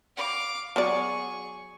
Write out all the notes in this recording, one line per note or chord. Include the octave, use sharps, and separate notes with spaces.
F5 D6
F#3 B3 G#4 D5 C#6